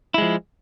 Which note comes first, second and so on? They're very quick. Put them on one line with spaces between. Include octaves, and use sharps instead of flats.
E4 G#3 F3